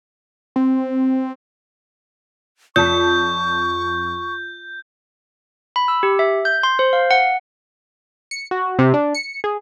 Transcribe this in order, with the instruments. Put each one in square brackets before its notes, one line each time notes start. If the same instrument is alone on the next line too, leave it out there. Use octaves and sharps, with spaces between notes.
[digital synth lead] C4
[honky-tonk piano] F2 A5 B6 [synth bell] F4 [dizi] C#6 [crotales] G6
[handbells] B5
E6
G4
E5
G6
C6
C5
F5
F#5
[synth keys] C#7
F#4
C3
D4
C#7
G#4